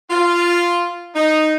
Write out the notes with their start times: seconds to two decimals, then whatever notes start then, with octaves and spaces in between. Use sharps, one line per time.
0.11 F4
1.15 D#4